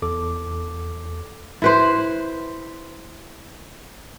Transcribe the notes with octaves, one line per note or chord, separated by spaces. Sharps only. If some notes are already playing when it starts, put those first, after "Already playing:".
E2 A4 D6
E4 B4 C5